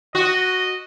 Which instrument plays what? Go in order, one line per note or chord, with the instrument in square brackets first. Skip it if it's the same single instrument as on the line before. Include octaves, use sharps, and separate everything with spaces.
[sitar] F#4 [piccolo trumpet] D#5